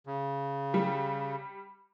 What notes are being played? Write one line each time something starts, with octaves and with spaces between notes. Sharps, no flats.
C#3
G3